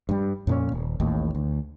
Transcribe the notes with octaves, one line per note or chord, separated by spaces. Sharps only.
G2 G3
F2 A#2 C#4
D#1
A1 D#2 A2
D2